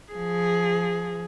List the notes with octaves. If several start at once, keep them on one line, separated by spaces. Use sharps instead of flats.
F3 G#4